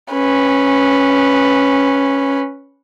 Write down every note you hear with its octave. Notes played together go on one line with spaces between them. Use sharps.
C#4 B4